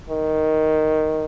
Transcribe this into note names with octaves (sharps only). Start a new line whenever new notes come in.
D#3